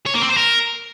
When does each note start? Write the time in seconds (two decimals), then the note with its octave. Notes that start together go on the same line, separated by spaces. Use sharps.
0.06 C#5
0.14 A#3
0.22 C4
0.29 C5
0.37 A#4